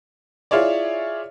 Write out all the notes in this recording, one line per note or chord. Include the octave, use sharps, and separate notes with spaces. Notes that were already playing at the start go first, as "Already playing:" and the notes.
E4 F4 G#4 C#5 D5